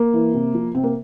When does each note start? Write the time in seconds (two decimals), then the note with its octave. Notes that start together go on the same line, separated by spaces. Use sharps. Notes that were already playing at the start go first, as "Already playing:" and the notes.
Already playing: A#3
0.14 E3
0.34 C3
0.54 F3
0.75 C3 C4
0.83 A#3